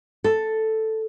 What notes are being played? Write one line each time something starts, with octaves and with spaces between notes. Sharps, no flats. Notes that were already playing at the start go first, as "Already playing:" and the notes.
A4